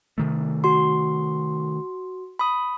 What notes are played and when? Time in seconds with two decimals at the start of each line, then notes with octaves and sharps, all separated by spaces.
0.18 C3 D#3 A3
0.64 F#4 C6
2.39 B5 D#6